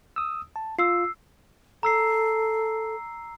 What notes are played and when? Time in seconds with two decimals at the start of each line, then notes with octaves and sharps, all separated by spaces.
0.16 D#6 E6
0.56 A5
0.79 F4 E6 C7
1.83 A4 A#5 E6 C7